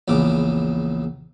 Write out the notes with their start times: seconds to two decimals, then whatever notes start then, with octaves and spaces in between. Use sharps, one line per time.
0.08 A#1 E2 C#3 D6